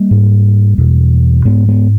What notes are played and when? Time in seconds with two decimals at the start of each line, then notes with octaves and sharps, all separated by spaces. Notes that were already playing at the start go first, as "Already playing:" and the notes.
Already playing: G3 A#3
0.11 G#2
0.78 E2 B2
1.45 G#2 G#3 B3
1.68 G#3 B3